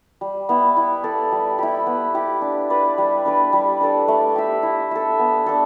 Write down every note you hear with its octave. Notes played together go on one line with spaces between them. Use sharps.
G3
B3 E4
E4
A4 D5
G3
E4 G4
B3
E4 G4
D4
B4 D5
G3
D4 B4 D5
G3
D4 A4 D5
A3
G4 E5
E4
A4 E5
B3
D4 A4